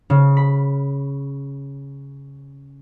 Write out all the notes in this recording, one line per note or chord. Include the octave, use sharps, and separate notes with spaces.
C#3
B5